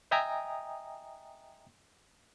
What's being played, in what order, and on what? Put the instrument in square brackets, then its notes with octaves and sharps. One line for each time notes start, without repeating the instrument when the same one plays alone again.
[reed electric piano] D#5 E5 G5 G#5 A#5 D#6